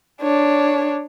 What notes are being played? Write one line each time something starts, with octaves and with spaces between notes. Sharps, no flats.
D4 C#5